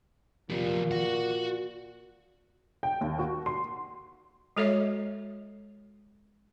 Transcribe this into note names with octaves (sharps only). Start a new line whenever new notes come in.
A#2 F3 G4
F#4 F#5
G5
D#2
F#4
C6
G#3 F#4 A4 C#5 D#5 E5